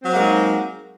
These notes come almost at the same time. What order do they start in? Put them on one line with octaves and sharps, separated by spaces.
C4 F#3 A#3 G#3 D#4